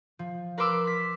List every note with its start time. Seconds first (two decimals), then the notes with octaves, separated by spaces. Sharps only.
0.19 F3
0.58 A#4 B4 B5 C6 D6 E6
0.87 B6